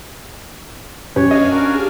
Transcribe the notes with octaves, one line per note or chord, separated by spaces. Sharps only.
F#2 B2 C#4 G4 B4 C#5
D4 D#5 F5 G#5
F#4 A#4
G4 G#4